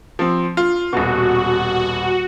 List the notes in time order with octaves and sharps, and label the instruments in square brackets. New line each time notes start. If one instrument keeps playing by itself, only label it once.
[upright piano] F3 C4
F4
[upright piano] D#1 B2 [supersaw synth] F#4